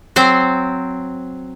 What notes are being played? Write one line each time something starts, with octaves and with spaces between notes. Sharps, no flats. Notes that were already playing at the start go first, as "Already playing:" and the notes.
F#3 C4 C5